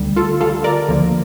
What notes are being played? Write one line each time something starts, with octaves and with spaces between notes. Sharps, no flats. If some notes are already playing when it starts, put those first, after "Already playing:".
Already playing: D2 D3 G3
F4 A4
D2 D3 G3 F4 A4
A#4 D5
D2 D3 F3 A#3